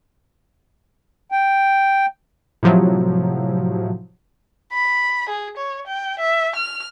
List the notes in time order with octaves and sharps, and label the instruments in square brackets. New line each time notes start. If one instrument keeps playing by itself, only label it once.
[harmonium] G5
[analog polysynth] A2 C3 F3 F#3
[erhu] B5
G#4
C#5
G5
E5
F6